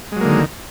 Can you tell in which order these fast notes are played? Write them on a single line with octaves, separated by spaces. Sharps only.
G#3 F#3 A#3 D3 D#3